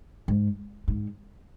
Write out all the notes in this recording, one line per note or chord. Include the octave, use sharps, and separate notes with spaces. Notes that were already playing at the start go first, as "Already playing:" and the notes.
G#2
G#2